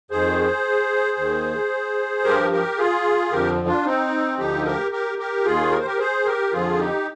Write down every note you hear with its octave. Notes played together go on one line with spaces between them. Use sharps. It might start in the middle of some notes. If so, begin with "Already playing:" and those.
F2 D#3 G#4 C5
D#2 D#3
G2 F3 G4 A#4
G4 A#4
F4 G#4
F2 D3 F3 G4 A#4
D4 F4
C4 D#4
D2 D3 F3 D#4 G4
G4 A#4
G4 A#4
G4 A#4
D#2 D#3 F4 G#4
A#4
C5
G4 A#4
G#4 C5
G4 A#4
F2 D3 F3 F4 G#4
D#4 G4